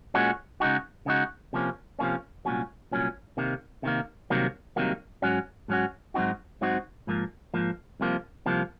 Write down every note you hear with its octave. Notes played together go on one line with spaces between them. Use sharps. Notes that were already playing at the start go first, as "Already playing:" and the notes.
A#2 G#3 C#4 F#4
C#3 G#3 D#4 F#4
C#3 G#3 D#4 F#4
C3 F3 A#3 C#4
C3 F3 A#3 C#4
C2 A#2 F#3 C#4
C2 A#2 F#3 C#4
C3 D#3 A#3
C3 D#3 A#3
C2 C3 D#3 F#3 A#3
C2 C3 D#3 F#3 A#3
G#2 F#3 C#4 F#4
G#2 F#3 C#4 F#4
G#2 F#3 C4 D#4 F#4
G#2 F#3 C4 D#4 F#4
G#2 F3 A#3
G#2 F3 A#3
C2 C3 F3 A#3
C2 C3 F3 A#3